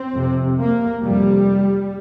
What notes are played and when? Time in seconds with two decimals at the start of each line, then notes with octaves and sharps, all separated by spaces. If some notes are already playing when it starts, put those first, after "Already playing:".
Already playing: C4
0.15 F2 C3
0.58 A#3
1.02 F2 C3 G3